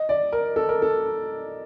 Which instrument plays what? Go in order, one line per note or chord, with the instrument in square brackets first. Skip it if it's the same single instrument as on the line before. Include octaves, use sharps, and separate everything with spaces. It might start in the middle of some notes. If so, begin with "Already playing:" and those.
Already playing: [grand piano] D#5
D5
A#4
A4
A#4
A4